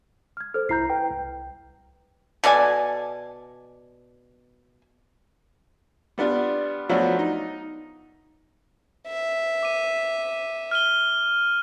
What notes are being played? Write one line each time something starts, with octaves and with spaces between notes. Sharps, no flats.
F6 G#6
A4 C5 F6
C2 E4 A#5 G6 C7
B4 G5
C2
B2 A4 D5 G#5
G3 B3 D4 F4
F3 F#3 A3 B3 D4 F#4
D#4
E5
D6 D#7
F6 D#7 G7